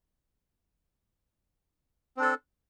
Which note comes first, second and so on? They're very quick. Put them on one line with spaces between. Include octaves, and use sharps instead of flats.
C4 D4 A4